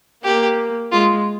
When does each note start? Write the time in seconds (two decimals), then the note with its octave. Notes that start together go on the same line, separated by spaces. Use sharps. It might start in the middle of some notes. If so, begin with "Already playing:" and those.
0.24 A#3 G4
0.92 G#3 F4